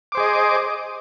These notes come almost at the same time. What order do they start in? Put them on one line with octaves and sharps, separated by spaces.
D6 C5 G#4 D#5